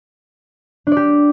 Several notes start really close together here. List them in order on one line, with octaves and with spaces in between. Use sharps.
D4 D5 G4